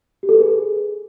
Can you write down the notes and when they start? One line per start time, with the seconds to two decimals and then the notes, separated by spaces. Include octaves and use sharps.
0.23 G4
0.29 A4
0.35 B4
0.41 G#4